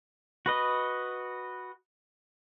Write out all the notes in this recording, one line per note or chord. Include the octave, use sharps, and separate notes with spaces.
F#4 B4 D#5